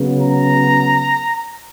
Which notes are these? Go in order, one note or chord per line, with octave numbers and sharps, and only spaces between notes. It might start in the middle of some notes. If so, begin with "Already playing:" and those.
Already playing: C#3 F#3 B3
A#5